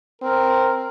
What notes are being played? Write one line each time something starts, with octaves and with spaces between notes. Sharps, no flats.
C4 A#4